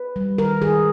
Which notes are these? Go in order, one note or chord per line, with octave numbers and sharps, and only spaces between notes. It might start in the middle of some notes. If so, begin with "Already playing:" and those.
Already playing: B4
G3
D#3 A#4
D#3 G#4